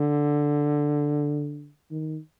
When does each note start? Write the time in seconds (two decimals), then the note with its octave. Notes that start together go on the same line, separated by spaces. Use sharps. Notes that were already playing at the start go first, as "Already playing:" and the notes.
Already playing: D3
1.91 D#3